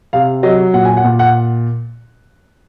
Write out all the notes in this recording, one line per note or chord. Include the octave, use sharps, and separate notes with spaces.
C3 F5
F#3 D#5
A#2 F#5
G#5
F#5
A#2
F#5